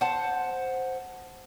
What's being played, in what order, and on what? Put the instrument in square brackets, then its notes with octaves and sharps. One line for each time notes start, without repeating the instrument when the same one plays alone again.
[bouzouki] C5 F#5 A5